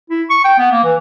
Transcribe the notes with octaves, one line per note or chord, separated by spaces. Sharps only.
E4
C#6
G5
B3
A#3
E3